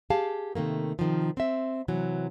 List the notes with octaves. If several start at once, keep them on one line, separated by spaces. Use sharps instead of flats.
G4 G#4 F5 A5
C3 D#3 A3 A#3
C3 D#3 F3
C4 E5
C3 E3 F#3